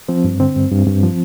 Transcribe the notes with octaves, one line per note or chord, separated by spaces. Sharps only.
F3 C4
G2
D3 C4
G2
G2
G2
F3